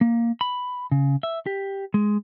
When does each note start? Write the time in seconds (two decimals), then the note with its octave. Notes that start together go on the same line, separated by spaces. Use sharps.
0.01 A#3
0.41 B5
0.91 C#3
1.23 E5
1.46 G4
1.94 G#3